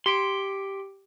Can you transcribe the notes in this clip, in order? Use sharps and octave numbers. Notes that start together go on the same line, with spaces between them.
G4 C6 B6 D7